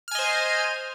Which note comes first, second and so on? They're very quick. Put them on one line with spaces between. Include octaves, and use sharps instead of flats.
F6 G#5 D#5 C5